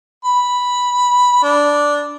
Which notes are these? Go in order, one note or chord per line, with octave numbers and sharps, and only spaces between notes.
B5
D4